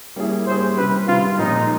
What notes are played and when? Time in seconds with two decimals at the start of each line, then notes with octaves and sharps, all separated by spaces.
0.16 G3 A#3 C#4 E4 G#4
0.47 G3 A#3 C#4 E4 G#4 C5
0.76 C3 D#3 G3 B4
1.08 C3 D#3 G3 F4
1.38 A#2 F3 G#3 C4 D#4